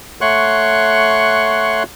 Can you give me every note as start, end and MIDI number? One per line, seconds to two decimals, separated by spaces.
0.21 1.83 57
0.21 1.83 73
0.21 1.83 78
0.21 1.83 84
0.21 1.83 85
0.21 1.83 90